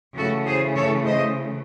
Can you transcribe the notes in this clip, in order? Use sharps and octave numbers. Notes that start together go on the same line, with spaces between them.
C#3 E3 A3 F#4 A4
G#4 C5
A4 C#5
C5 D#5